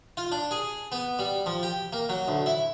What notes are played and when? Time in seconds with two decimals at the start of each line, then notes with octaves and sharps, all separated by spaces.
0.17 F4
0.32 D4
0.51 G#4
0.92 B3
1.19 G3
1.46 F3
1.63 G4
1.93 A#3
2.09 F#3
2.28 D2
2.46 E4